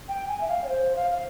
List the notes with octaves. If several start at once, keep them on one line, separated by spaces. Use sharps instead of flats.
G5
G#5
E5
F5
C#5
C5
F5
F5